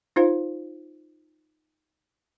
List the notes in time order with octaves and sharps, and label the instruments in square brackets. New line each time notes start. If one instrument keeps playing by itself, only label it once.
[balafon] D#4 F4 C5 F5